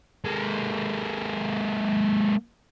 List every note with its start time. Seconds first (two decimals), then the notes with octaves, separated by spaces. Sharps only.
0.25 G#3 A#3